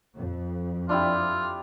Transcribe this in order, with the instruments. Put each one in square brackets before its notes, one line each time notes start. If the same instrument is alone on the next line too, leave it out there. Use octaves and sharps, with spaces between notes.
[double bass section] F2
[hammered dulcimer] D4 E4 G4 [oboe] F4